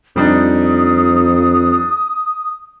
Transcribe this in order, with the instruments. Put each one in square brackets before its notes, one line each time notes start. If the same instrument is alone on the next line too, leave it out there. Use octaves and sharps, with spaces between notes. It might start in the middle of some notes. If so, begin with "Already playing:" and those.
[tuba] F2 [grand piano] G3 D4 D#4 [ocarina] D#6